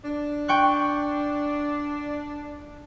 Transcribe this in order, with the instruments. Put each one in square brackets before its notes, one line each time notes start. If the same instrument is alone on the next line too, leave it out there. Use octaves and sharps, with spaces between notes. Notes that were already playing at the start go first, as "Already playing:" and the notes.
[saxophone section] D4
[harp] G5 C#6 F#6